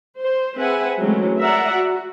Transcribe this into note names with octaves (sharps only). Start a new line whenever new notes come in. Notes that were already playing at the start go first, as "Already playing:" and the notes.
C5
C4 G#4 B4 E5 F#5 G#5
E3 F#3 G#3 A3 C4 C#4
A#4 D5 E5 F#5 A#5
F#4